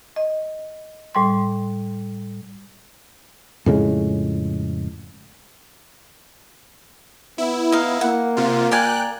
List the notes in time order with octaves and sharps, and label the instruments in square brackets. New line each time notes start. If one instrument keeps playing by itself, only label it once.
[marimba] D#5
A2 G3 C6
[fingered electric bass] F2 A2 C#3 G#3
[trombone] B3 [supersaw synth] E4
[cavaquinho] D#4 F5
[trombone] A#3 [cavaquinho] F#5
[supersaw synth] C3 F4
[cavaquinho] A#4 D5 G#5 [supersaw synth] G5 F#6